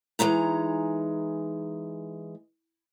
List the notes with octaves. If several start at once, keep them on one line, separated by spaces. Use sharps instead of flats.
E3 G#3 D#4 A#5